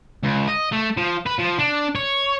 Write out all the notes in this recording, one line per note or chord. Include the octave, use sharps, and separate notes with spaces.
C#2
D#5
A3
F3
B4
F3
D4
C#5